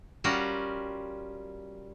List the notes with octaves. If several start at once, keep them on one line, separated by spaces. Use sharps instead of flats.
G3 C#4 F4 F#4 A#4